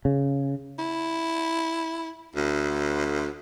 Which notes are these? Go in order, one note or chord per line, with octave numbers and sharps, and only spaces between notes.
C#3
E4
D2